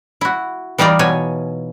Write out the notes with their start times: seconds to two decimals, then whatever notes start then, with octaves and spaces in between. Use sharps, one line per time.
0.21 E4 F#4
0.78 E3 G3 D#4 F4 D5
0.99 B2 C#5 G#5